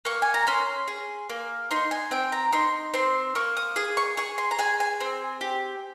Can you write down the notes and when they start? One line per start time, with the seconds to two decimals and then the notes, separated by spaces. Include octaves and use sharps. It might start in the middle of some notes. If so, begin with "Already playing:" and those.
0.05 A#3 C#6
0.22 G#5
0.34 A#5
0.47 C#4 C6
0.88 G#4
1.29 A#3
1.71 D#4 C6
1.91 G#5
2.11 C4 G5
2.32 A#5
2.52 D#4 C6
2.94 C4 C6
3.35 A#3 C#6
3.57 D#6
3.76 G#4 D#6
3.97 C#6
4.17 G#4 C#6
4.38 C6
4.51 A#5
4.58 G#4 G#5
4.80 G#5
5.00 C4
5.41 G4